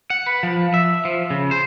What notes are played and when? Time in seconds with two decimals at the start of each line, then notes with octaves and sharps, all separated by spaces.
0.10 F#5
0.26 B4
0.43 F3
0.74 E5
1.05 F3
1.30 C#3
1.51 C5